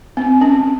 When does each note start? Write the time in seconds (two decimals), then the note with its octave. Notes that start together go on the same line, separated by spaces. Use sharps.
0.17 C4
0.41 C#4